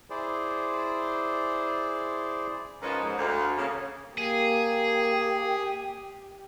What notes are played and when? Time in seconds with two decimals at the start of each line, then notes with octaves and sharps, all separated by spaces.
0.10 E4 G#4 C5 D5
2.82 G#2 F3 C#4 D#4 A#4 B4
3.03 G#2
3.18 D2 F5
3.57 C#3 A#3
4.18 A#3 G4 G#4